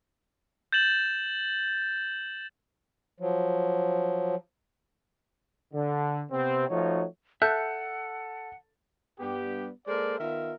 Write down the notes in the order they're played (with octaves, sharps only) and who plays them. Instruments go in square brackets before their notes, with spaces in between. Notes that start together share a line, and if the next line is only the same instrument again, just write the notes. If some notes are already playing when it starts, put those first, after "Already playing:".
[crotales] G6 A6 E7 F#7
[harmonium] F3 F#3
[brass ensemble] D3
C3 B3 C4
F3 A3 D#4 F#4 C#5
[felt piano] A4 [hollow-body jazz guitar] E5 [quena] F#5 [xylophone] F#6 G6
[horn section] G2 B3 G4
G#3 A#3 A4 A#4 C5 D5
D#3 B3 F4 A#4 E5